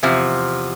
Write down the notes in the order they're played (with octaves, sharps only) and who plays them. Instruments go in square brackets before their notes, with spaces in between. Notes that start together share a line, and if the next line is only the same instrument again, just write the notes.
[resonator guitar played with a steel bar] E2 C3 F3